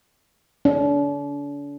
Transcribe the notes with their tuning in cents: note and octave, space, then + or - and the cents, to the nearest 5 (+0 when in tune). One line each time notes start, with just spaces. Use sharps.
D4 -40